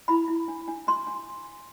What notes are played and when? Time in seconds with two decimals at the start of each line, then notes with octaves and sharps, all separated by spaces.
0.08 E4 B5
0.28 E4
0.48 D4
0.68 D4
0.87 D4 C6
1.07 D4